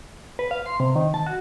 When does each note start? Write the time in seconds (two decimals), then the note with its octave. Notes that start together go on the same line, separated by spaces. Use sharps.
0.39 B4
0.51 F5
0.66 C6
0.80 C3
0.95 D#3
1.14 A5
1.27 F#4